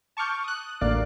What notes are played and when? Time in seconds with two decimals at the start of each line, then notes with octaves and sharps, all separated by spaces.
0.17 A5 C#6 D6 F6 G6
0.44 D#6 F#6
0.81 A1 D2 A#3 D5 F5 F#6